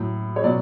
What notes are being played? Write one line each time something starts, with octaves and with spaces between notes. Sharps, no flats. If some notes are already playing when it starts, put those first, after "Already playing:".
Already playing: A2 F#3
C#5
B2 F#3 D5